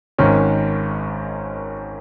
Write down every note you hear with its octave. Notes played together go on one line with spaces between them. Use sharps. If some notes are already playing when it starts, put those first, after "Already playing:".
G#1 G#2 D#3 C#4